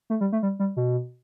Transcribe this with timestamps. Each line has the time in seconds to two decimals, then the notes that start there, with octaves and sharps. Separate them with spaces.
0.10 A3
0.21 G3
0.32 A3
0.43 G3
0.59 G3
0.76 B2